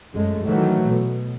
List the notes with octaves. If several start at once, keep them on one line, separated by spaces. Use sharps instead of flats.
F#2 G#3 A3
D#3 E3 F#3 A3
B2